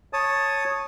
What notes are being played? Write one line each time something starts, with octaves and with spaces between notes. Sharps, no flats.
C#5 A5 D#6